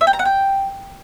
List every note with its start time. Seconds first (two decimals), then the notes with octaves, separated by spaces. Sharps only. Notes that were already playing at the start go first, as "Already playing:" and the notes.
0.01 E5
0.07 G5
0.13 A#5
0.19 F#5
0.25 G5